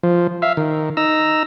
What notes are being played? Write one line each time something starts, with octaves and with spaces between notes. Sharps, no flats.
F3
E5 F5
D#3
D#4 A#5 E6